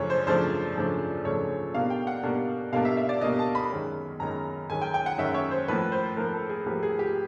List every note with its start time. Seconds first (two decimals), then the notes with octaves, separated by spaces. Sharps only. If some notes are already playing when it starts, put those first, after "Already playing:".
Already playing: F#2 C#3 F3 A3 D4 C#5
0.10 C5
0.26 F#2 C#3 F3 A3 D4 C5
0.75 F#2 C#3 F3 A3 D4
1.25 F#2 C#3 F3 A3 D4 C#5
1.74 B2 G3 A#3 D4 F5
1.90 G5
2.07 F#5
2.23 B2 G3 A#3 D4
2.72 B2 G3 A#3 D4 F5
2.85 E5
2.97 E5
3.09 D5
3.21 B2 G3 A#3 D4 D#5
3.39 A5
3.55 B5
3.71 F#2 D#3 G#3 C#4
4.20 F#2 D#3 G#3 C#4 A#5
4.69 F#2 D#3 G#3 C#4 G#5
4.82 G5
4.94 G5
5.06 F#5
5.18 F#2 D#3 G#3 C#4 E5
5.34 C#5
5.51 C5
5.68 A2 F3 A#3 B4
5.92 C5
6.17 A2 F3 A#3 A#4
6.33 A4
6.49 G#4
6.66 A2 F3 A#3 G4
6.83 G#4
6.99 G4